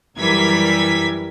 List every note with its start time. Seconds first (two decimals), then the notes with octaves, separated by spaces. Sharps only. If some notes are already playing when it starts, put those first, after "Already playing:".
0.19 F#2 E3 G3 A#4 G#6 B6